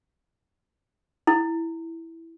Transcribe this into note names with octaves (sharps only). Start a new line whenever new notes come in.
E4